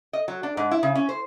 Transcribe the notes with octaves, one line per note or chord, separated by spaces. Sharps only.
D#5
F#3
D4
G#2
E4
C#3
C#4
C5